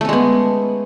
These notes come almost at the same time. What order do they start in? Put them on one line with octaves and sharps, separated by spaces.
A3 C#4 G#3 B3